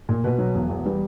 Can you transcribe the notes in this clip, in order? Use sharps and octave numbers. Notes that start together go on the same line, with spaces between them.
A#2
B2 B4
F#3
E1
E2
G3 B4